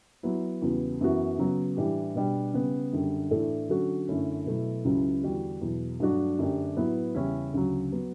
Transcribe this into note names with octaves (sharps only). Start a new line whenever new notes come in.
F#3 B3 E4
E2 C#3 G3 B3 F#4
F#2 E3 B3 F#4
C#3 F#3 B3
A2 E3 G3 D4 G4
B2 G3 D4
C#3 G3 B3
F#2 D3 G3
A2 E3 A3 D4 A4
D3 F#3 C#4 F#4 A4
F#2 D3 A3 C#4 E4
B2 F#3 A3 E4
C#2 C#3 F#3 C#4 E4
E2 D3 G3 D4 F#4
E2 B2 F#3
G2 F#3 A3 D4 F#4
F#2 D3 A3 D4 G4
A2 F#3 B3 E4 B4
E2 C#3 G3 C#4 E4
D2 C#3 F#3
F#3 B3